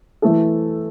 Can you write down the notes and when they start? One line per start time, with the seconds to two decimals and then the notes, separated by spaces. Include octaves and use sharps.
0.22 E3 A3 E4 A4